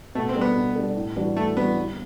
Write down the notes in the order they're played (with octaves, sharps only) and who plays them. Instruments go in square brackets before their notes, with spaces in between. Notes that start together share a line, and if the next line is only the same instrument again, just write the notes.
[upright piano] B2 [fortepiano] A3
[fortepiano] C4
[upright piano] G3 D4 A4
[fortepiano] B3
[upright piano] B2
G3 D4 A4
A2
E3 G3 D4 F#4
[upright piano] A2 [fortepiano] A3
[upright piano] E3 G3 D4 F#4 [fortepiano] B3
[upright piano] G1